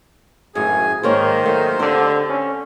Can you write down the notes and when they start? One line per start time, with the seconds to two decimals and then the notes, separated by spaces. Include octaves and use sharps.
0.55 G#1 F#2 A2 G#4 G#5
1.03 G#2 D#3 A#3 C5 C#5
1.46 F#3 A3 A#3
1.79 D3 C4 G4 D5
2.29 C#4